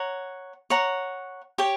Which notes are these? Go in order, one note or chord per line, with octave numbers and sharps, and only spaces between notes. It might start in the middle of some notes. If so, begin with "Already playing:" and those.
Already playing: C#5 F#5 A#5
C#5 F#5 A#5
G4 C#5 G5